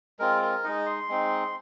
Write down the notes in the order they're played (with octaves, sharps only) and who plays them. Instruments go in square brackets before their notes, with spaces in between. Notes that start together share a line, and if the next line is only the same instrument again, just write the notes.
[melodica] G#3 C4 F4 A#4
A#4
G#3 D#4 D#5
C6
G#3 C4 D#4